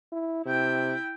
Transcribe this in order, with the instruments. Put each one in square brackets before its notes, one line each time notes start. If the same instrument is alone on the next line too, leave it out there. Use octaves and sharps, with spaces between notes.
[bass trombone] E4
[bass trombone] C3 [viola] E4 G5